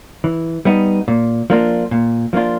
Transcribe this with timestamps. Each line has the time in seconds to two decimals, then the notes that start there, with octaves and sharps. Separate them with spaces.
0.24 E3
0.65 G3 B3 D#4
1.08 A#2
1.50 F3 A#3 D4 F4
1.91 A#2
2.33 F3 A#3 D4 F4